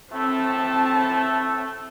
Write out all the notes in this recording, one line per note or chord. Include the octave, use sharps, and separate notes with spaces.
A2 A3 C4 A5